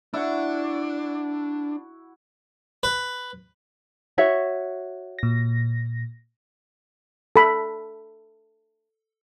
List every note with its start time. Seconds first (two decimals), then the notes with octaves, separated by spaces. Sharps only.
0.14 D4 E4 F#4 F#5
2.83 B4
4.18 F#4 C#5 E5
5.19 A#2 A#6
7.36 A4 B5